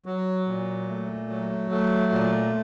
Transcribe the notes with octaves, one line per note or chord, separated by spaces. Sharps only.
F#3
A#2
A3
F#3
A3
A#2